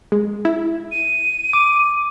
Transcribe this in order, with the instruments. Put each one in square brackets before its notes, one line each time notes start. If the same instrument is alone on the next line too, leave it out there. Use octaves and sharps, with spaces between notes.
[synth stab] G#3
E4
[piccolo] D#7
[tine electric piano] D6